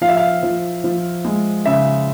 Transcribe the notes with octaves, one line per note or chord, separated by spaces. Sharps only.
F3 F5
E5
F5
F3
F3
G#3
C#3 E5